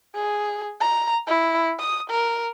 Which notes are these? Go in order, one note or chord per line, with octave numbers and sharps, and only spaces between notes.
G#4
A#5
E4
D#6
A#4